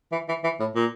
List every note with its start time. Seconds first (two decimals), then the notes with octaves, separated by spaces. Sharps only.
0.12 E3
0.29 E3
0.44 E3
0.60 A2
0.75 A#2